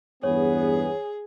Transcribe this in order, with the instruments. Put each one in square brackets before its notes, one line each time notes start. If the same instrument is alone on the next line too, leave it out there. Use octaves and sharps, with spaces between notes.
[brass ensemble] E2 G2 B3 [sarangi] G#4 [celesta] C#5